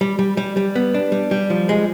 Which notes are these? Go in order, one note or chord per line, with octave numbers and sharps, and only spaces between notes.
G3
G3
G3
G3
B3
D4
G3
G3
F3
G#3